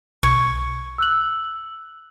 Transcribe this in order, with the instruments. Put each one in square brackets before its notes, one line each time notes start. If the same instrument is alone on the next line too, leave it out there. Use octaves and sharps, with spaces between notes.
[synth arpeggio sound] B1 G#6 [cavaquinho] C#6
[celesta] E6 F#6 F#7